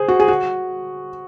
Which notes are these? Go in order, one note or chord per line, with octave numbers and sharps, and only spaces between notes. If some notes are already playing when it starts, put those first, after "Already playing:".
Already playing: G#4 C5
F#4
G#4
F#4